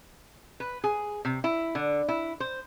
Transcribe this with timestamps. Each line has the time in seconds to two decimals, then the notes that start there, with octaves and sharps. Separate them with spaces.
0.60 B4
0.84 G#4
1.25 C3
1.44 E4
1.75 D3
2.08 E4
2.40 C5